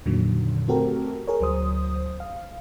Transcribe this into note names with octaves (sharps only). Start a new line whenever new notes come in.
F2 A#2 D3 D#3 F#3
A3 C4 F#4 G4 A4 A#4
G#4 A#4 C#5
D2 F#3 C5 D#6
F5